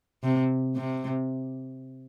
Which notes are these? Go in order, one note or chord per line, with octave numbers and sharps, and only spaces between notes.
C3
C3